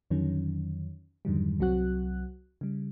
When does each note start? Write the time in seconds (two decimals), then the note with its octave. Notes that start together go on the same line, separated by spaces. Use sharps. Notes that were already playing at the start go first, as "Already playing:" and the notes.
0.10 F2 D3 D#3 F#3 C#4
1.25 F2 G#2 D3 D#3 F#3 G3
1.60 C2 F#3 C4 F#4 F#6
2.61 C#3 G3